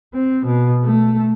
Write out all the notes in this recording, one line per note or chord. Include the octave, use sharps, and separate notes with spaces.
C4
B2
A3